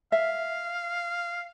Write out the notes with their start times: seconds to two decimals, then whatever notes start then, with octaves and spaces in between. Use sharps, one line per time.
0.12 E5 F5